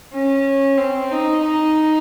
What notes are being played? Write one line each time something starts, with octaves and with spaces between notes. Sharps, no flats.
C#4
C4
D#4
D#4